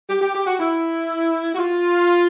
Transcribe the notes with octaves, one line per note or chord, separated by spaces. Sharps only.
G4
G4
G4
F#4
E4
F#4
F4